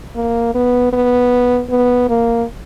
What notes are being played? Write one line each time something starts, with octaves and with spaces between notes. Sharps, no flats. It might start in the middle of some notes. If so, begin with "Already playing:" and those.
A#3
B3
B3
B3
A#3